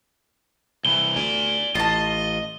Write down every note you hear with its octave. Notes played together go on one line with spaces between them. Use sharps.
C2 E3 G7
D2 D5 G#5
A1 F4 D#5 A5